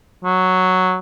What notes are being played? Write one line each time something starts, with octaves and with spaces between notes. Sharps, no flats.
F#3